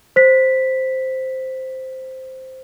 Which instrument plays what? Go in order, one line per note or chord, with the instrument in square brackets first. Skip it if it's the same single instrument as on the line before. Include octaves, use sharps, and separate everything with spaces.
[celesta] C5 B6